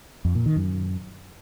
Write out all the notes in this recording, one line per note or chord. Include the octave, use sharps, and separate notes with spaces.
F2
A#2
D#3
F#2